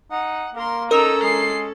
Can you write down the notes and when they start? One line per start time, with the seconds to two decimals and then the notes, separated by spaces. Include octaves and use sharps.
0.11 D#4 F#5
0.55 A#3 A#4 C6
0.91 C#4 D#4 A4 A#4 A#5 E6
1.23 G#3 C7